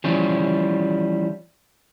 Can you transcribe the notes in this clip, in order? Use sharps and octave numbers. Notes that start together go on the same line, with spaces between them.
E3 F3 G3 C#4